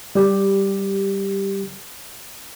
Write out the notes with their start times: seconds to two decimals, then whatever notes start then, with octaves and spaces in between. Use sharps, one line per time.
0.15 G3 G4